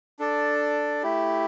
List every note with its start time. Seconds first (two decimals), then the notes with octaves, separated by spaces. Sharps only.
0.19 D4 A4 D5
1.03 A3 E4 G4